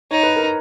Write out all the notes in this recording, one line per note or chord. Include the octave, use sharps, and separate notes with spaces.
D#4 C#5
B4
A#4